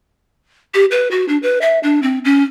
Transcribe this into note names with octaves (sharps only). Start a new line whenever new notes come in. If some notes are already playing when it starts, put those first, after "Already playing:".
G4
B4
F#4
D4
B4
E5
D4
C4
C#4